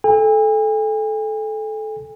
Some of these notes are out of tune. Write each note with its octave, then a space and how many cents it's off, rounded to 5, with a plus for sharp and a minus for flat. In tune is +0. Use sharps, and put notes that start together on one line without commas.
A4 -20 G#5 -45